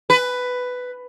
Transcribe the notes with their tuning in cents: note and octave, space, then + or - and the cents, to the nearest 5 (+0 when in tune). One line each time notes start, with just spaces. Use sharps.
B4 +10